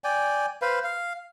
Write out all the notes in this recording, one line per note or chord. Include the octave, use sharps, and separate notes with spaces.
D5 G5 G#5
B4 C5 F5
F5